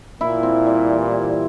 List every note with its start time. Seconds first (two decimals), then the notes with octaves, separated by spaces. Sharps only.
0.21 A#2 E4
0.43 C4
0.66 G3
0.90 E3
1.12 E4